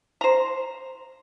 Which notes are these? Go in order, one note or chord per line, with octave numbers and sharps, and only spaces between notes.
C5 A#5